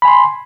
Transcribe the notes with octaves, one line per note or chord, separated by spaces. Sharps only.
G#5 B5 C6